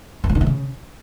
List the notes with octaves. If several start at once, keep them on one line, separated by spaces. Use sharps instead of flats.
F#2
A#2
D3
B2
C#3